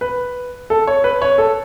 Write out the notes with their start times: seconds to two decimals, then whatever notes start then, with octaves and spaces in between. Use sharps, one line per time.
0.01 B4
0.70 A4
0.87 C#5
1.04 B4
1.22 C#5
1.38 A4